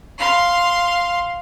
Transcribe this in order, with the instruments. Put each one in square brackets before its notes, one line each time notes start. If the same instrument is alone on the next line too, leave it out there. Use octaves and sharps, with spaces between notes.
[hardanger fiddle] F5 C6